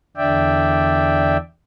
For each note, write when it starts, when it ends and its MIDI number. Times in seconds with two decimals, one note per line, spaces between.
0.17 1.37 40
0.17 1.37 50
0.17 1.37 62
0.17 1.37 74
0.17 1.37 76
0.17 1.37 79